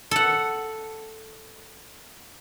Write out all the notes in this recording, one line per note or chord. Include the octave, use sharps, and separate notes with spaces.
A4 F#5